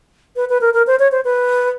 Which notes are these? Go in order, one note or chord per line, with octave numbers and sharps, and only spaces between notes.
B4
B4
A#4
A#4
C5
C#5
C5
B4